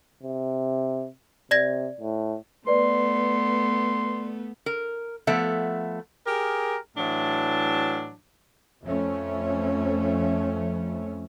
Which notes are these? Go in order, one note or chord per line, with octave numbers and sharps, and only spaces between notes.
C3
C3 D5 G#6 A#6
A2
A3 B3 B4 D5 C6
A#4
F3 A3 B3 E5 F#5
G4 G#4 A#4
A2 E3 F#3 D4 A5
F2 F3 A3 C#4